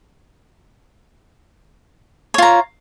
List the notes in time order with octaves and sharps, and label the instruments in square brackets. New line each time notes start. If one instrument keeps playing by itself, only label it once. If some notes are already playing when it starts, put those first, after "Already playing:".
[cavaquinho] C#5
F4
A#5